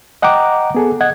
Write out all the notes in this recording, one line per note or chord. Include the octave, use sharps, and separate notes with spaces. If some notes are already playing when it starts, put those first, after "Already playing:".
D#5 F#5 G5 A#5 D6
B3 G#4 A4
D#5 F#5 G#6